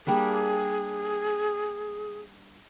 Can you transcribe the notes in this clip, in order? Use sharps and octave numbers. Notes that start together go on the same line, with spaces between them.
G3 A#3 D4 G#4